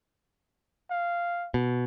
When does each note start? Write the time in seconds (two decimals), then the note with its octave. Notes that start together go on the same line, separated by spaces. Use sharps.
0.91 F5
1.54 B2